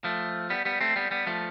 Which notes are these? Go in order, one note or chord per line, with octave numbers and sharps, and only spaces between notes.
F3 A3
G3 B3
G3 B3
A3 C4
G3 B3
G3 B3
F3 A3